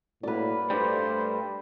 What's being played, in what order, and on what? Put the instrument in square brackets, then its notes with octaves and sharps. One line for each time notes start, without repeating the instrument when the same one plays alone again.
[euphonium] A2 [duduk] A#3 [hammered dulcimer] B4 D5
[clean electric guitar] G2 G3 [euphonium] A3 [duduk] C5